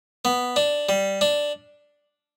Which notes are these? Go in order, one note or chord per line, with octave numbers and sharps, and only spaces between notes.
B3
D4
G3
D4